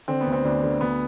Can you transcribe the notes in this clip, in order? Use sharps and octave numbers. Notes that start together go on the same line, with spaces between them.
D3 C4
B3
D2
C4
D2 D4
D3
D2 B3